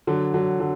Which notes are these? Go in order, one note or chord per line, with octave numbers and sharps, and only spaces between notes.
D3 F#3
D3 F#3
D3 F#3